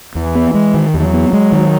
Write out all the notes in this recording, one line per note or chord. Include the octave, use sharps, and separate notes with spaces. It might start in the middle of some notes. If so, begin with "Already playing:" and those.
E2 E3
B3
G#3
D#3
E2 F#3
B3
G#3
D#3